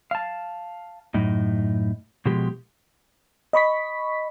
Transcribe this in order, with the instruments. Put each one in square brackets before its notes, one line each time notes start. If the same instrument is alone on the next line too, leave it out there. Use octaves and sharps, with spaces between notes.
[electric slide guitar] F5 A5
F#2 A2 D#4
B2 F3 G#3 G4
[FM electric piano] D#5 B5 C#6 B6